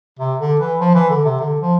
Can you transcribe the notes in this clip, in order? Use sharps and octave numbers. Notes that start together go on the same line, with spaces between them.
C3
D3
E3
F3
E3
D3
C3
D3
F3